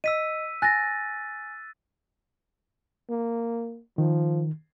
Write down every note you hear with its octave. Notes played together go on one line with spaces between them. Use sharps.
D#5 E6 B6 D#7
G#5 F#6 A6 A#6
A#3
D#3 F3